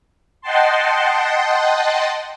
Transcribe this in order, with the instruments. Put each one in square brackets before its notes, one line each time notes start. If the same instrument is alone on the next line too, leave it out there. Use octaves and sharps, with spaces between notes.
[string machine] D#5 F#5 G5 A5 C6